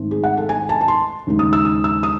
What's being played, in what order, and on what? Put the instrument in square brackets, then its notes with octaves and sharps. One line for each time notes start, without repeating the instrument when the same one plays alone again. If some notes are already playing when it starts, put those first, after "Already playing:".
Already playing: [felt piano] G#2 D#3 A3 C4
G#4
F#5
A4
G#5
A5
A5
C6
D#2 C#3 G#3 D#4
D#6
E6
D#6
E6
D#6